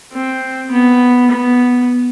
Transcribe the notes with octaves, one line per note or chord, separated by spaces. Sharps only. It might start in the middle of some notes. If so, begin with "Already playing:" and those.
C4
B3
B3